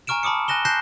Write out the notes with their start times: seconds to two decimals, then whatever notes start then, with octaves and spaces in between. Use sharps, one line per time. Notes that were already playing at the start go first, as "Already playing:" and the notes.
0.07 G#5 A#5 C#6 F6 D7 E7
0.23 A5 B5 D6 D#6 C#7
0.48 G#5 F#6 A#6 E7 G7
0.65 A5 F#6 G6 A#6 C7 E7